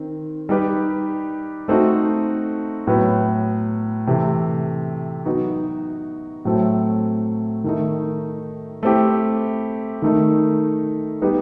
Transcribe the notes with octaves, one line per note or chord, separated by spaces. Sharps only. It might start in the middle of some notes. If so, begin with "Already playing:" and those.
Already playing: D#3 C4
G3 D#4 G4 B4
A3 C4 D#4 F#4 A4
A2 F#3 B3
C3 E3 A3
F#3 B3 D#4 F#4
A2 F#3 A3 C4
D#3 A3 D#4
A3 C4 E4 G4
D#3 A3 D#4
G3 B3 D#4 G4